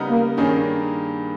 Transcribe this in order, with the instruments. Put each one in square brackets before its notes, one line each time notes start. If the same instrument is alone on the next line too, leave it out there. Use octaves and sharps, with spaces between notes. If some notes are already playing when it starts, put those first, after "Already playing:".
Already playing: [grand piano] C#3 G3 B3 D#4 A#4
[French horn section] A#3
[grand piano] G2 D#3 A#3 D#4 G#4 [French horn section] C#4